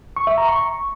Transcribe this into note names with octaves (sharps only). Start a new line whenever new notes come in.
C#6
E5
A#5
C#6